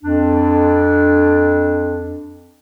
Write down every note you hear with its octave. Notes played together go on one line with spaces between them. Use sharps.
F2 D4